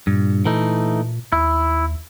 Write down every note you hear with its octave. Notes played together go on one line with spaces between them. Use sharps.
G2 A#2
E3 A3 D#4
D#2 E4